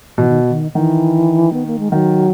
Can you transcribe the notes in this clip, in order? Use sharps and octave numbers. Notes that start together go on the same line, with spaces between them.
B2 E3
D#3
D#3
D#3 E3
B3
A#3
G#3
D#3 F#3